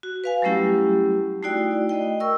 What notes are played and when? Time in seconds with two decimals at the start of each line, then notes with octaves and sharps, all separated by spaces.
0.03 F#4
0.24 B4 F5 G#5
0.42 F#3 G3 A3 C#4 E4 G4
1.43 A3 D#4 E4 F#4 D5 G5
1.89 A3 D#5 G5
2.20 A#4 C#6 E6